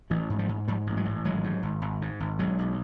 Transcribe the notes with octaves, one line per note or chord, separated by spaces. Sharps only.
A1 E3 F#3
G#2
F3 G3
G#2
G#2 F3 G3
A1
F#3 G#3
A1
G#1 F#3 G#3
G#2
G#1
G#1
G#2
G#1
B1 F#3 G#3
B1